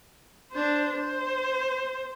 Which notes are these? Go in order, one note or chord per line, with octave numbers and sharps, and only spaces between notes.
D4 C5
C5